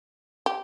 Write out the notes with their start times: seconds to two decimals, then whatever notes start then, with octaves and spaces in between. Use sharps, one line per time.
0.46 G4